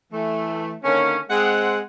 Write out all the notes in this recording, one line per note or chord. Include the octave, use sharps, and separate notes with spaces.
E3 A3
D3 D#3 A#3 C#4
G#3 C4 F#5